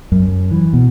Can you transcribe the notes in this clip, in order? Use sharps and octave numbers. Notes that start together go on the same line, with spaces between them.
F#2
E3
B2